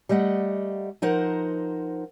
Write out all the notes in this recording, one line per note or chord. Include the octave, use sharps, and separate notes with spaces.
G3 A3 D#5 F#5
F3 D#4 A#4 C5 F#5